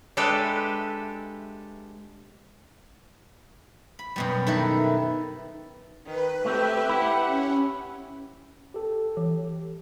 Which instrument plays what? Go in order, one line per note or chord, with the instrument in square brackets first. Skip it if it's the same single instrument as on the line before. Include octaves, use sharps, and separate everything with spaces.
[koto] G#3 D4 G4 A4 B4 E5
[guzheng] B5
F#2 B2 G3
D#3 E4 A4 B4
[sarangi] D#3 [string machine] B4
[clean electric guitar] A3 C4 [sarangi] G4 [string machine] B4 E5
[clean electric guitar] E4 [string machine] F#5
[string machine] C#4
[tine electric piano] G4 A4
[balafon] E3